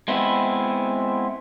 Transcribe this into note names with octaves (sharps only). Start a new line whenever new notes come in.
G#3 B3 C4 E4